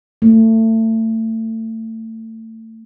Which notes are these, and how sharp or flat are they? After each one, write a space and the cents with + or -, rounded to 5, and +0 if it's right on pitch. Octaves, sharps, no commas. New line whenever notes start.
A3 +30